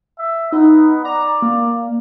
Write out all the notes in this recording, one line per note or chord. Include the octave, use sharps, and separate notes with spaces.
E5
B3 D#4
D5 A#5
A#3